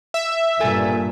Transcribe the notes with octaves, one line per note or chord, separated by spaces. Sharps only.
E5
G2 A#2 A4 G#5 A6